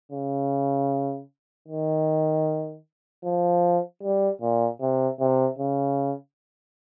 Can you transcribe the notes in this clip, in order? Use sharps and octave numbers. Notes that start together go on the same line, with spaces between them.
C#3
D#3
F3
G3
A#2
C3
C3
C#3